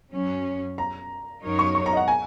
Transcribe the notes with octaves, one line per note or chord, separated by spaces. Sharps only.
F#2 F#3 C#4
A#5
F#2 F#3 D#4 A#4 C#5
C#6
C#6
A#5
D#5
F#5
G#5